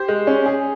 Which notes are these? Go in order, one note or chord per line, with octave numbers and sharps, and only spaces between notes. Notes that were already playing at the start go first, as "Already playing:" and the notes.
Already playing: G4 C5
G#3
C#4
G#4